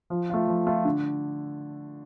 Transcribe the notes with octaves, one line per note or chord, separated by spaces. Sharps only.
F3
A3 F4
F3
A3 F4
D3